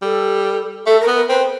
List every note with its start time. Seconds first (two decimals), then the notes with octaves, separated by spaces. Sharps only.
0.02 G3 A4
0.86 A3 A4
1.00 A#4
1.07 B3
1.14 A#4
1.29 C4 B4